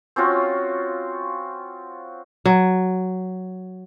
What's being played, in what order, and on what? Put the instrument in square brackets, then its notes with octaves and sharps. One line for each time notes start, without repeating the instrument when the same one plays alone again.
[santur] C4 C#4 F4 F#4
[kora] F#3